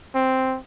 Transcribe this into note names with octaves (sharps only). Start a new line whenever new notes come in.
C4